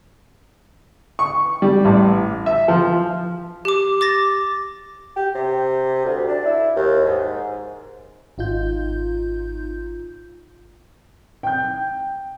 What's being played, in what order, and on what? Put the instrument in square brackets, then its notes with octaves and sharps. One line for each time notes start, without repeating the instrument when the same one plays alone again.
[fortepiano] C#6
G3
A1
E5
F3
[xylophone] G4 D6
D6 A6 A#6
[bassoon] G4
C3
D2
D4
E4
D#2
G#2
[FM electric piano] G#1 D#4 F4 G6
[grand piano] G5 G6